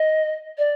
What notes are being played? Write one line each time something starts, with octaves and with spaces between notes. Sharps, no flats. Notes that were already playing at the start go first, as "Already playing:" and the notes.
Already playing: D#5
D5